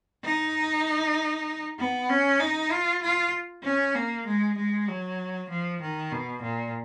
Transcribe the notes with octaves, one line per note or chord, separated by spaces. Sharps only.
D#4
B3
C#4
D#4
F4
F4
C#4
A#3
G#3
G#3
F#3
F3
D#3
B2
A#2